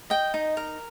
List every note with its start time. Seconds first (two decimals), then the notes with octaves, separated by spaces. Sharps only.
0.10 D#5 G5
0.34 D#4
0.57 A#4